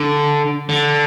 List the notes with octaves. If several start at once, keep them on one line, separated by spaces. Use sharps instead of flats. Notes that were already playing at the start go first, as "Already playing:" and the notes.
Already playing: D3
D3